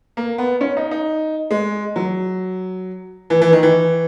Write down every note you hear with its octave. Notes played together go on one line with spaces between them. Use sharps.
A#3
B3
C#4
D#4
D#4
G#3
F#3
E3
E3
D#3
E3